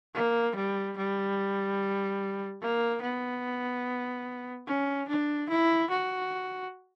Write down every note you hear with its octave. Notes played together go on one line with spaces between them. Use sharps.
A#3
G3
G3
A#3
B3
C#4
D4
E4
F#4